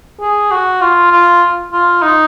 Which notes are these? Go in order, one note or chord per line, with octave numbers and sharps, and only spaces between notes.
G#4
F#4
F4
F4
F4
D#4